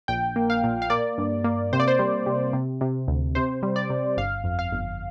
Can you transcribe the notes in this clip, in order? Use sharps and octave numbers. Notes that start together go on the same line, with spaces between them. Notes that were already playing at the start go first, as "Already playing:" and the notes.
A#1 G5
A#3
F5
A#2
F5
A#3 D5
G2
A#3
C3 C5
D5
C5
G3
C3
C3
C3
D2
C3 C5
G3
D5
C3
G1 F5
F2
F5
G1